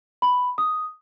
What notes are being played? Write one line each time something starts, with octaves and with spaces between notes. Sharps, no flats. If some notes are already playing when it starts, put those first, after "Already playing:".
B5
D#6